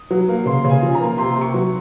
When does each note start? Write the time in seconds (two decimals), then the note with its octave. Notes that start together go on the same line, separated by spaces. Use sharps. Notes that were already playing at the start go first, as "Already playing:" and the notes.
Already playing: D#6
0.11 F#3
0.28 A#3
0.46 C#3 C6
0.64 C#3
0.70 G#5
0.83 F3
0.95 A#5
1.00 A#3
1.18 C3 C6
1.35 C3
1.42 C#6
1.54 F#3